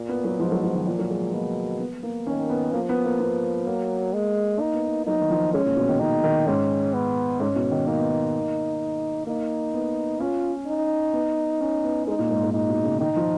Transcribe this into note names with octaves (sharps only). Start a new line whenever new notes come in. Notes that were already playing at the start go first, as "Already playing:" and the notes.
Already playing: A#2
B3
F#3
G#2 F3
F#3
F#3
D#3
A#2 F3
F#3
G#3
B2 A#3
B3
A#3
D#3 C#4
B3
F3 A#3
B3
A#3
B3
F#3 A#3
G#3
A#3 D#4
B3
A#3
F#3 D#4
D#3
F3
G#3 C#4
A#2
B2
D#3
D#3 D#4
D#3
G#2 C#4
B3
G#2 C#4
B2
D#3
A#3 D#4
B3
A#3
A#3 D#4
B3
C#4 F4
D#4
B3
C#4
B3
G#3 D#4
A#2
G#2
G#2
A#2 D#4
B2
C#3
D#3 D#4
F3